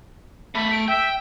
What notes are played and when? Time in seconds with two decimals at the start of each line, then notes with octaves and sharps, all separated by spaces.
0.55 A3 B5
0.71 D7
0.88 E5 G5